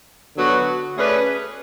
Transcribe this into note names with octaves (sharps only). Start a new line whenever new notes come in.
D3 F#3 B3 F#4 B4
A3 C#4 G#4 B4 D5